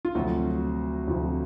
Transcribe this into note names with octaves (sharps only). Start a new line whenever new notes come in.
F4
D2 C3 F3 F#3 A3 F#4
D2 C3 F3 A3